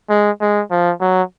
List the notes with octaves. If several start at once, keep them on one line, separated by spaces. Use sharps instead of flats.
G#3
G#3
F3
F#3